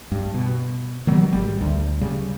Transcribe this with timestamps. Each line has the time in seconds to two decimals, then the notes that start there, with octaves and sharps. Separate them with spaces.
0.12 G2
0.34 B2
1.07 D#3 F#3 G3 B3
1.33 G#1 G3
1.61 D2
2.01 C#3 G3